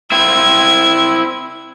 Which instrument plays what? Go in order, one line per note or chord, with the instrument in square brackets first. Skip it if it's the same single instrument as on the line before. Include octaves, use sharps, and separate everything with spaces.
[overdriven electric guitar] C4 E4 [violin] G#6